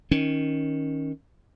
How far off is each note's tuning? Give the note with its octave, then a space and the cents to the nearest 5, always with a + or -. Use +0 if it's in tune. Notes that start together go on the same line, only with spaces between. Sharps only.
D#3 +10 C#4 +0